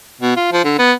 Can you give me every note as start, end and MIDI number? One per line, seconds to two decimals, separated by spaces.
0.21 0.35 47
0.36 0.50 65
0.52 0.63 53
0.64 0.78 50
0.79 0.93 59